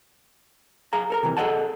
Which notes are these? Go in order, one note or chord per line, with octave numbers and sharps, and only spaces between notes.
G#4 F5 A#5
A4 A#4 A#5
C3 E3
G#4 A4 C#5 D#5 F#5 A5